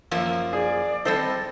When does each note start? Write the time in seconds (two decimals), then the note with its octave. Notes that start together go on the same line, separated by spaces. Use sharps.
0.11 F#2 F3 A#3
0.53 G#4 D5
1.05 G3 C4 A4 C5 D#5 A6